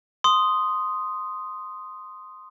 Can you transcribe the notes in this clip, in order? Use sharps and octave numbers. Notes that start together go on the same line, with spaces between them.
C6 D#6